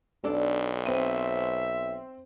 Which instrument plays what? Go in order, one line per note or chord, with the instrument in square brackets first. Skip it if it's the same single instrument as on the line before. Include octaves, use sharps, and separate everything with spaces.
[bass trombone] B1 [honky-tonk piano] D4 [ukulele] A4 D5
[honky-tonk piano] C4 C5 D#7 [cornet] E5